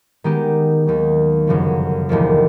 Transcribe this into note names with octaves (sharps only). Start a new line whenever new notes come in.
D#3 G#3 B3 D#4 G4
D#2 D#3 F#3
G1 F#2 C#3 F3
E1 D#2 D3 F3